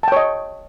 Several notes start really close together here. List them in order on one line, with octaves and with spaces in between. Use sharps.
A5 G5 C#5 D#5